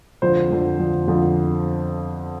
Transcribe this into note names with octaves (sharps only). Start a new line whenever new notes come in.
F2 D3 F3 C5
F2 D3 F3
F2 D3 F3
F2 D3 F3